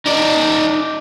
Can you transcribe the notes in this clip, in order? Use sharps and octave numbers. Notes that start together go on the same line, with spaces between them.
D#4 D5